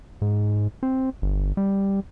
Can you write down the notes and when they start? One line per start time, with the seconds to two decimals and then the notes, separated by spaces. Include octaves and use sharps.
0.22 G#2
0.83 C4
1.22 G1
1.57 G3